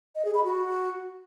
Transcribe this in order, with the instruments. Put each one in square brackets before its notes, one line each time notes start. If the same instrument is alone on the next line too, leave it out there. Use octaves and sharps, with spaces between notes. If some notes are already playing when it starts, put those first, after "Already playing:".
[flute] D#5
G#4
B5
F#4